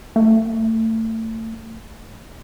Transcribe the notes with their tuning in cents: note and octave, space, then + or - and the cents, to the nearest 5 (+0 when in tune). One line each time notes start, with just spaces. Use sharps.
A3 +30